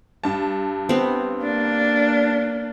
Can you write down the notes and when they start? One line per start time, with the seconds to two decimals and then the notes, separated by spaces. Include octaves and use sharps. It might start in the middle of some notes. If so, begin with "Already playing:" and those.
0.24 G2 A5
0.89 B3 C4
1.42 A#3 D4